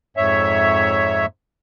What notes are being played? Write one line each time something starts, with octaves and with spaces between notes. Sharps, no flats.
F2 G#2 C#5 E5